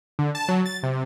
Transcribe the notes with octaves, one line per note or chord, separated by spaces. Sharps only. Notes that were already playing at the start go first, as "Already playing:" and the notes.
D3
A5
F#3
A6
C3